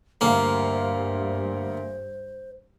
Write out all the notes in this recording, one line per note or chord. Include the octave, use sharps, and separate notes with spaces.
D2 G2 A#3 C5 F5